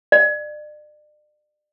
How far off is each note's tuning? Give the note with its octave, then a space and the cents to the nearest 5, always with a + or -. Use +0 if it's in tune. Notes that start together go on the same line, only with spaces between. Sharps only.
D5 +35